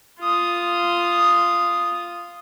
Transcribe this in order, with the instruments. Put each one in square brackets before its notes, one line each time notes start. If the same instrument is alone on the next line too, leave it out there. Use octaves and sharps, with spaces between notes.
[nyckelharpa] F4 D#6